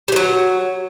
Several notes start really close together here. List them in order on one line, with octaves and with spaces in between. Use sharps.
G3 E3 F#3